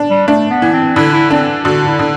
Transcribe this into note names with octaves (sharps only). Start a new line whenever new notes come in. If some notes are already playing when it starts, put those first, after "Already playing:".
Already playing: D4
G3
A3 D4
B3
E3
C4
D3 E4
E4
C4 D4
D3 F#4
E4
D3